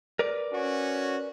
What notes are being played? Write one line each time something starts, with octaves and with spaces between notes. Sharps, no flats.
A#4 B4 D5
C#4 F#4